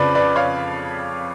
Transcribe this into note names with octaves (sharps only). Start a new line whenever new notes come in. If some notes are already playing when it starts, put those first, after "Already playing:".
Already playing: F2 C#3 F3 B4 D5
B4 D5
C#5 F5